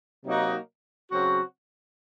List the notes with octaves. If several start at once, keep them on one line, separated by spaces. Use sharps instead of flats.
C3 F#3 A#3 D#4 F#4
C#3 F#3 C4 F#4